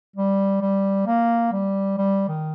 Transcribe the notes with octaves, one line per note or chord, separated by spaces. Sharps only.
G3
G3
A#3
G3
G3
D#3